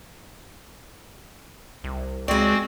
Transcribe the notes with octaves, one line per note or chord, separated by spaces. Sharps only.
C2
C#2 G#3 C4 F#4 D5